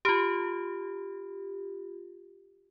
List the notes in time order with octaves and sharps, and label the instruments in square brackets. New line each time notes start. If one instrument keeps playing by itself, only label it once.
[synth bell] F4 G4 [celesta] B5 F6 D7